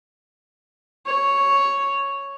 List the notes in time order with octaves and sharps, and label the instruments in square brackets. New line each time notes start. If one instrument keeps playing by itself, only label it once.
[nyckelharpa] C#5